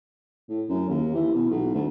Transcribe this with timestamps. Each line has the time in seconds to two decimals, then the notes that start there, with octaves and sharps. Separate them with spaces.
0.49 A2
0.69 F#2
0.89 D#2
1.14 E3
1.35 B2
1.50 B1
1.74 D2